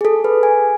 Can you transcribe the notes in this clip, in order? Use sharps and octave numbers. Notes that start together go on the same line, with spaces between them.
G#4
A4
B4
G#5